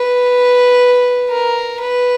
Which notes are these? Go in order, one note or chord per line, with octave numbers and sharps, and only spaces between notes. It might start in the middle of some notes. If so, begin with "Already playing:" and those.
Already playing: B4
A#4
B4